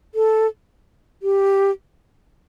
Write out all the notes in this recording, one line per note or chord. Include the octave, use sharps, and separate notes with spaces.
A4
G4